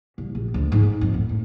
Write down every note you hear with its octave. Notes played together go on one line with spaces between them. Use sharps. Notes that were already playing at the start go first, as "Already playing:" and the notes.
C2
A#1
D2
G#2
F2
A2
A2